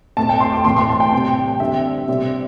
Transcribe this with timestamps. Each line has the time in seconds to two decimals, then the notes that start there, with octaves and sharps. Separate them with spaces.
0.17 A2 A3 C4 A5
0.29 G5
0.40 C6
0.52 D6
0.65 A2 E3 C4 C6
0.76 C6
0.89 A5
1.00 G5
1.12 C3 G3 C4
1.60 D3 G3 C4 E5
2.08 C3 G3 C4